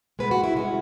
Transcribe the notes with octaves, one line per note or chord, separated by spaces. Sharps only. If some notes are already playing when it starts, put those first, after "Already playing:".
B2 G#3 B3 B4
F#4
E4
B2 G#3 C#4 F#4